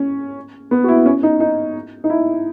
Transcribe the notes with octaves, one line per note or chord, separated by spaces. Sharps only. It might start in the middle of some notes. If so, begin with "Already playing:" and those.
Already playing: C#4
B3
F#4
E4
C#4
D#4
D#4
D#4
E4